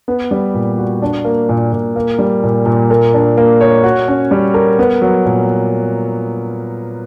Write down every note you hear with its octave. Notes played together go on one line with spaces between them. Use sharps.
B3
G3
A#2
F#4
D4
A#3
A#2
A#2
A#3
G3
A#2
A#2
A#4
D4
A#3
C#5
F#4
C#4
G3
A#4
B3
F#3
A#2